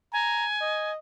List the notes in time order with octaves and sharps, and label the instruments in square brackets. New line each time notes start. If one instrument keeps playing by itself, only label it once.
[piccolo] G#5 [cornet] A#5
[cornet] D#5